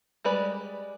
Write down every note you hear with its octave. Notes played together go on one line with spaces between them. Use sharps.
G3 G#3 B4 D5